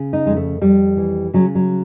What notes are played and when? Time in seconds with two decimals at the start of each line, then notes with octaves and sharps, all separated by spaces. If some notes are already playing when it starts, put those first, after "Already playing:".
Already playing: C#3
0.13 D#4
0.25 F2 G#3
0.36 A3
0.61 F2 G3
0.97 E3
1.34 C#3 F#3
1.55 F#3